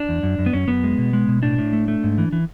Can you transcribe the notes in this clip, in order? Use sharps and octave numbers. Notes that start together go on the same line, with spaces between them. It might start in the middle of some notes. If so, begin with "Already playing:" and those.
Already playing: D4
E2
F#2
F#2
B3
F#2 C#4
F#2 B3
G#3
B2
G#3
B2
A2 D4
A2
A3
A3
G#2
E3
E3